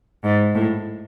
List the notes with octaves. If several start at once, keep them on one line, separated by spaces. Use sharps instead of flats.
G#2
A2